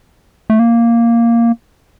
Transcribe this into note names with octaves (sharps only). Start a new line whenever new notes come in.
A3
A#3